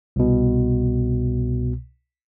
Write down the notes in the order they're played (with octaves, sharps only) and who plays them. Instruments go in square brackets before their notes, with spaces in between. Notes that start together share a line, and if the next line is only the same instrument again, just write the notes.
[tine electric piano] C2 B2